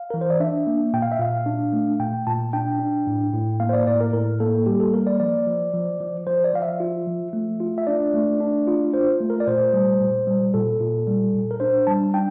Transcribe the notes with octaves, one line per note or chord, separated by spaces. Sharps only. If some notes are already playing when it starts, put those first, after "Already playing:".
Already playing: F5
E3 A#4
C5
D5
D4 E5
A#3
A#2 G5
F5
E5
A#2 F5
D4
A3
A#2 G5
A#2 A5
D4 G5
D4
A2
A2
A#3 F5
C5
D5
A2 D5
A#4
A2 A#4
A#3 A4
G3 G4
A4
A#3 A#4
D5
F3 D5
F3
F3
F3
F3 C5
D5
F3 F5
E5
F4
F3
A3
F4
E5
D4 D5
A3
D4
F4
F4 C5
A3
A#4
D5
A#2 C5
G3
A#2
G3
A#2 A4
A#2
G3
A#2
A#4
D4 C5
G3 A5
D4 G5